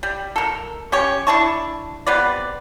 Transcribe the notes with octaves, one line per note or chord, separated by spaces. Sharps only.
G3
A4 A#4
C#4 G4 C#5
D4 E4 A5 C#6
C3 B3 B4 D5